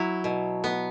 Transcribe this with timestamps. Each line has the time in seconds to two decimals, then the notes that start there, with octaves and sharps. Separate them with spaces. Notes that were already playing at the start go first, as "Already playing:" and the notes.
Already playing: F#3 E4
0.24 B2
0.64 B3